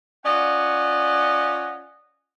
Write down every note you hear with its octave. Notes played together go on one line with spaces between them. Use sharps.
C#4 F4 D5 D#5 F#5